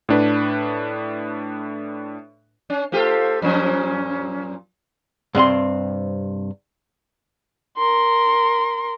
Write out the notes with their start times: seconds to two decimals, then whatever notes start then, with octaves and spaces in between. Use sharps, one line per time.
0.09 A2 D4 B4
2.70 C#4
2.92 A3 F4 G4 A4 C5 F5
3.42 F#2 A#2 F3 C#4
5.35 G2 C3 C4 C6
7.77 A#4 C6